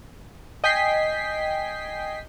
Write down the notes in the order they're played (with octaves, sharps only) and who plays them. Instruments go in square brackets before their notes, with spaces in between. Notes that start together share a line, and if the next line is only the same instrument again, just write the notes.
[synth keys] D#5 G5 G#5 B6 C7